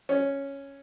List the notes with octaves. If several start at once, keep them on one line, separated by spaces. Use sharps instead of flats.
C#4